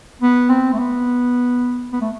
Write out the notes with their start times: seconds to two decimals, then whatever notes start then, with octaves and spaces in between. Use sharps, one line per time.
0.22 B3
0.49 C4
0.73 A3
0.79 B3
1.93 B3
2.01 A3